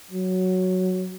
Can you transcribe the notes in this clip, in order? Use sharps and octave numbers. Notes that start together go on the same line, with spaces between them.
F#3